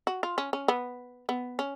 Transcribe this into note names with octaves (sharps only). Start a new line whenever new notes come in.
F#4
F4
C#4
C#4
B3
B3
C#4